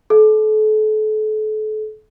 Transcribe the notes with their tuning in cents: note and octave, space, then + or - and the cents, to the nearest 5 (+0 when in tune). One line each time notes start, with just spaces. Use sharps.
A4 -35